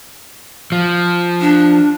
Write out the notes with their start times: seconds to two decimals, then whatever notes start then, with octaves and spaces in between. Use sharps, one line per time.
0.72 F3
1.41 D4